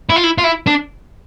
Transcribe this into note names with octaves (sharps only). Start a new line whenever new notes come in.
E4
F4
E4
F4
E4
D4